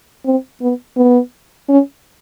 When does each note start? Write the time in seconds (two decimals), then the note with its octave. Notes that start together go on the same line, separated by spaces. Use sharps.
0.25 C4
0.61 B3
0.97 B3
1.69 C#4